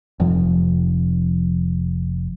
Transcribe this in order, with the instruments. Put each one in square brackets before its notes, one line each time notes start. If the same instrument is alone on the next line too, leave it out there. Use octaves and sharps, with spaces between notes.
[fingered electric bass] F1 F3